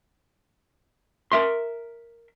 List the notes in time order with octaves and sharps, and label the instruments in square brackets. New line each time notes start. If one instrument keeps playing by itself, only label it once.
[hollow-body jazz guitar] A#4 E5 C6